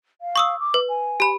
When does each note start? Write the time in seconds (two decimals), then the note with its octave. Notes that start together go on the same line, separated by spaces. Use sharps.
0.21 F5
0.36 C#6 D#6 E6
0.60 D6
0.74 B4
0.89 G#5
1.20 G4 B5